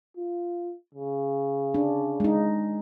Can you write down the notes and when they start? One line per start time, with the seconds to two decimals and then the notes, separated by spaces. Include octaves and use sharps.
0.17 F4
0.95 C#3
1.74 D4
2.20 G#3 D#4